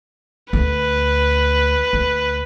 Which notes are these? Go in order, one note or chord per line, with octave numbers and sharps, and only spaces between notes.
D2 B4
D2